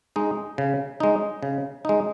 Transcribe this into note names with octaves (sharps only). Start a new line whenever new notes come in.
G#3 D#4
C#3
G#3 D#4
C#3
G#3 D#4